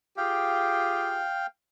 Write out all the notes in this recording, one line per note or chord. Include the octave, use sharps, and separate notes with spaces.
F4 G4 G#4 F5 G5